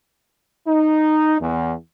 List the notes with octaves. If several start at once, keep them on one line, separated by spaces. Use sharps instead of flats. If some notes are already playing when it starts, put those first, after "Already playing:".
D#4
E2